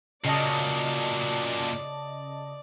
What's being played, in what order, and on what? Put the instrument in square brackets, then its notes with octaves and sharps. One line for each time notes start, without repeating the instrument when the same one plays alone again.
[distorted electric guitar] A#2 F#3 [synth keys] C#3 D#5 A5 [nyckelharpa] D5